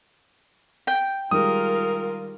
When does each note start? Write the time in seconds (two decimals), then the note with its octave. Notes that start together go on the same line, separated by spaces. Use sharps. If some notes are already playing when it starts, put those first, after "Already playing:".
0.87 G5
1.31 D#3 G3 G#3 F4 A#4 D#6